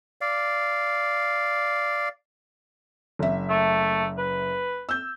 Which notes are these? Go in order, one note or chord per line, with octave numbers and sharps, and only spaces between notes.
D5 F5
F#1 E5
A3
B4
E6 G6